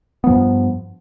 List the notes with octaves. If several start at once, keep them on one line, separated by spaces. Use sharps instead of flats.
G2 F3 B3